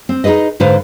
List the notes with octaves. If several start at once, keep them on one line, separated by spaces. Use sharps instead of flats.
C4
D#4 F4 G#4 B4 D#5
G#2 D3 B4 C5 F5